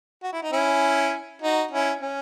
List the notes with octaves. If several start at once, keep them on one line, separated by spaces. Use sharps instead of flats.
F#4
E4
D#4
C#4 E4
D#4 F#4
C#4 E4
C#4